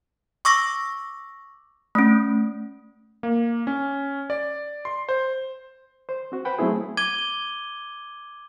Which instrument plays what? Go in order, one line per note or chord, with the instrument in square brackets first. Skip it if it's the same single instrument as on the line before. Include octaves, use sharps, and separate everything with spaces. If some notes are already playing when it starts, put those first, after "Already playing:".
[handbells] C#6 D6 E6 A#6
A3 C#4
[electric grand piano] A#3
C#4
D5
C6
C5
[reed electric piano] C5
C4 F#4
B4 C5 F#5 G5 B5
F#3 A3 B3 C4 E4 G#4
[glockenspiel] D6 G#6 D#7 G7